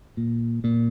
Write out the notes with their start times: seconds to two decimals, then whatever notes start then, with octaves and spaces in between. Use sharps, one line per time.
0.17 A#2
0.64 A#2